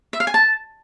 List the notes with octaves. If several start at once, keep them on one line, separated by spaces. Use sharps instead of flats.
E5
F5
G#5
A5